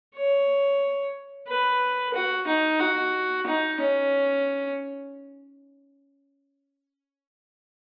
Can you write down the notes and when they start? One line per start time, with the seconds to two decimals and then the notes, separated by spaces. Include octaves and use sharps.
0.16 C#5
1.48 B4
2.14 F#4
2.47 D#4
2.80 F#4
3.47 D#4
3.80 C#4